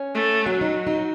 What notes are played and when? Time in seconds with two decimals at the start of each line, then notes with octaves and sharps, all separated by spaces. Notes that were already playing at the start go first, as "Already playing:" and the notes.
Already playing: C#4
0.15 A3
0.46 F#3 C#4
0.61 D#4
0.87 D#4